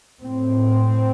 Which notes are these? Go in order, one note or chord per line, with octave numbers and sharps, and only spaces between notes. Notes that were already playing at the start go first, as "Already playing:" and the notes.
A2 C4